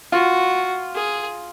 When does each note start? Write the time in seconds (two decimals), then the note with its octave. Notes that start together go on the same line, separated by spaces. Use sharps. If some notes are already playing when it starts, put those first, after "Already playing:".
0.12 F4 F#4
0.95 G#4